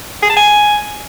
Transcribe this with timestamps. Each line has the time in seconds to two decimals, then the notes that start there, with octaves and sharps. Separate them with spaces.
0.23 G#4
0.30 A5
0.37 G#5